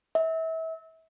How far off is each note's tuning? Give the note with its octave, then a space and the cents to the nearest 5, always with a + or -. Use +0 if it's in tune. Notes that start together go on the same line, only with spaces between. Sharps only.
E5 -30